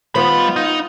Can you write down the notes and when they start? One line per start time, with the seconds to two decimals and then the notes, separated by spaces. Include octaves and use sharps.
0.15 D#3 G3 B3 F4 C5 F#5 B5
0.56 D#4